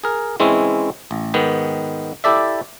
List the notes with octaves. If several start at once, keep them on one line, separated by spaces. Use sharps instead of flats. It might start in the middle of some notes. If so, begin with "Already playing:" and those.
G#4 A#4
E3 G#3 C4 C#4 E4
A1
G#2 D#3 B3
E4 G4 A4 D5 E5